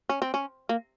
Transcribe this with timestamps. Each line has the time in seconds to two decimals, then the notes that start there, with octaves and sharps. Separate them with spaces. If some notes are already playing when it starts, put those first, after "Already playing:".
0.09 C#4
0.22 C4
0.34 C#4
0.69 A#3